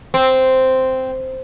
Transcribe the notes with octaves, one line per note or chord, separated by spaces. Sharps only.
C4